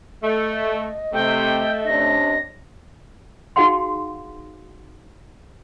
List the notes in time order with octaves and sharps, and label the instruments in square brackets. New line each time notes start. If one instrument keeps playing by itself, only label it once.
[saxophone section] A3 [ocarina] D#5
[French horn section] C3 [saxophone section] A3 [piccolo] G5
[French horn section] C3 C#4 D4 [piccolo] A#6
[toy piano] D#4 F#4 G#4 F5 F#5 C6